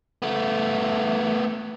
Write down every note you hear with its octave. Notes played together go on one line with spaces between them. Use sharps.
A3 B3